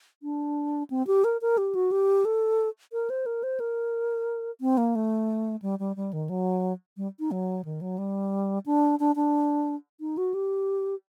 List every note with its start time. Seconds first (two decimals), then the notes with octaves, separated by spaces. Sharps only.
0.23 D4
0.90 C4
1.07 G4
1.24 A#4
1.41 A#4
1.58 G4
1.75 F#4
1.91 G4
2.25 A4
2.93 A#4
3.10 C5
3.26 A#4
3.43 C5
3.60 A#4
4.61 C4
4.78 A#3
4.95 A3
5.62 G3
5.79 G3
5.96 G3
6.13 D#3
6.29 F#3
6.97 G3
7.19 D#4
7.31 F#3
7.65 D#3
7.81 F#3
7.98 G3
8.66 D4
8.99 D4
9.16 D4
10.01 D#4
10.17 F#4
10.34 G4